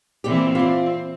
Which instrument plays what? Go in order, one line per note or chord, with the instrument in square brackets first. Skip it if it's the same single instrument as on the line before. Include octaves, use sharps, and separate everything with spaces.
[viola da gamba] A#2 E3 C4 [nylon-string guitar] G4 D5
[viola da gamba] C4 [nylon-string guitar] F4 D5